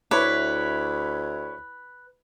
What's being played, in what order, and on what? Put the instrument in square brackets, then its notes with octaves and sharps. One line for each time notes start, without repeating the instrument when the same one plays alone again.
[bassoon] D2 [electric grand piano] E4 C#5 D6 [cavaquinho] B4